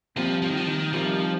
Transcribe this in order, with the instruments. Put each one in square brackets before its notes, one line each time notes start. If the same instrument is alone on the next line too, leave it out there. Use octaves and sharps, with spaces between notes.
[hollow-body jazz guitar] A#2 G3 C4 [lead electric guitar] F3
[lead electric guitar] F3
D#3
F3
D#3
[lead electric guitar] F3 [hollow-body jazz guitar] G3 C4 D#4 A#4